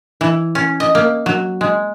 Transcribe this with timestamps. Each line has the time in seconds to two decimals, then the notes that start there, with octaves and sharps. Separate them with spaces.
0.21 E3
0.55 C#4
0.80 D#5
0.95 A#3
1.26 F#3
1.61 G#3